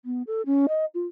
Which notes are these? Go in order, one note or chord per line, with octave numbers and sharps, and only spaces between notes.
B3
A4
C#4
D#5
F4